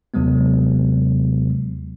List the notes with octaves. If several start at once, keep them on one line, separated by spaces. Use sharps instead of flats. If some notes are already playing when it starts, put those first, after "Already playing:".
D#2 C3 F#3 G#3 B3